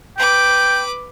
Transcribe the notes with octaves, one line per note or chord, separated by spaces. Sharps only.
B4 G5 D6